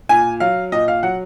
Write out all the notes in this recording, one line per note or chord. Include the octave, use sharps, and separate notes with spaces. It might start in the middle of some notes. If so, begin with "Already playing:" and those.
A#2 G#5
F#3 F5
A#2 D#5
F5
F#3 F#5